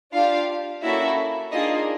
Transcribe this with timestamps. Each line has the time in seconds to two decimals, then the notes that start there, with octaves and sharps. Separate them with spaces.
0.12 D4 F4 G4 F5
0.82 A#3 C#4 E4 F#4 A4 E5
1.51 A#3 D4 D#4 F4 G#4 D#5